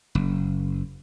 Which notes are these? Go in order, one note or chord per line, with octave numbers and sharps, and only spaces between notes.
F#1